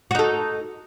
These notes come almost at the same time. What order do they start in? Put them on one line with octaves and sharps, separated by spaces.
F#4 D#4 A4